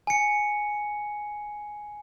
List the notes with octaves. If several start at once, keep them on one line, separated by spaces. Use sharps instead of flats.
G#5 C#7